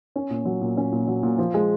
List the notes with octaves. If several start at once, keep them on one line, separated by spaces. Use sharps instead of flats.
C#4
A#2
F#3
A#2
C#4
A#2
F#3
A#2
F3
G#3